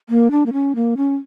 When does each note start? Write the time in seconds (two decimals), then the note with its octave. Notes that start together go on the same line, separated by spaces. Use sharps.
0.09 A#3
0.31 D4
0.46 A#3
0.53 C#4
0.75 A#3
0.97 C#4